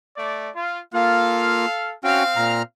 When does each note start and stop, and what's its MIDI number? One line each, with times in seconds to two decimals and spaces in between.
0.17 0.50 57
0.17 0.50 74
0.55 0.81 65
0.94 1.66 58
0.94 1.66 65
0.94 1.94 69
0.94 1.94 77
2.04 2.62 60
2.04 2.23 61
2.04 2.23 66
2.04 2.62 77
2.04 2.23 79
2.36 2.62 46
2.36 2.62 82
2.36 2.62 89